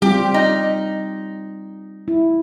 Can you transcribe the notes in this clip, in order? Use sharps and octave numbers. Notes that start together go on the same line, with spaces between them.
G3 C4 F4 G4
D#4
E4